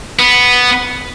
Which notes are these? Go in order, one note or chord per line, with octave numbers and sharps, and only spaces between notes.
B3